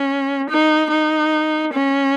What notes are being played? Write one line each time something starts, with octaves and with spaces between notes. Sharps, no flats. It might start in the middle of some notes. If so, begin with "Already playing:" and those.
Already playing: C#4
D#4
D#4
C#4